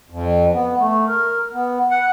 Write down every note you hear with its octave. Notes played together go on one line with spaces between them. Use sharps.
F2
B3
A3
A#4
B3
F#5